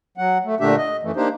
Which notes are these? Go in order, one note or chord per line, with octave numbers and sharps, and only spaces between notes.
F#3 F#5
A3
A#2 D3 A3 D4 G4 E5
D#5
F#2 E3 A3
A#3 D4 D#4 G4 C5